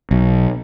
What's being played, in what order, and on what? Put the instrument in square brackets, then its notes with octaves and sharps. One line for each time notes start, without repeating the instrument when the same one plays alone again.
[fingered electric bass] B1